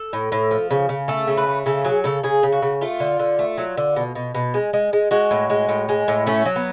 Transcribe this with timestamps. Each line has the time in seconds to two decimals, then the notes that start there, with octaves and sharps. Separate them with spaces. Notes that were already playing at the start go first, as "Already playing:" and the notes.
Already playing: A4
0.13 A2
0.32 A2
0.51 F3
0.71 C#3
0.89 C#3
1.08 A3 A4
1.27 C#3
1.37 B4
1.47 A3
1.66 C#3 A4
1.85 F#3 G#4
2.04 C#3 A4
2.23 C#3 G#4
2.43 C#3
2.52 F#4
2.62 C#3
2.81 A3 F4
3.00 D3
3.19 D3
3.39 A3
3.58 F#3
3.77 D3
3.96 B2
4.15 B2
4.34 B2
4.54 G#3
4.73 G#3
4.93 G#3
5.11 G#3 F#4
5.31 A2
5.50 G#3
5.69 A2
5.89 G#3
6.08 A2
6.26 A3 C#4
6.46 F#3
6.56 B3